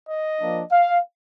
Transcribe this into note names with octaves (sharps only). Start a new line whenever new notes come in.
D#5
F3 A#3 D4
F5